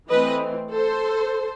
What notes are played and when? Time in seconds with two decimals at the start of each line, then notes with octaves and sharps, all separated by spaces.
0.10 E3 A3 C4 B4 D#5
0.72 A4 C5